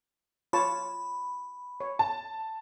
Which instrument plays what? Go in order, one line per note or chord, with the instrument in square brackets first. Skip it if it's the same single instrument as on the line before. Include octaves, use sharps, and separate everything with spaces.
[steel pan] F4 C#5 A5 [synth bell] B5
[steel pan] C#5
[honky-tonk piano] A5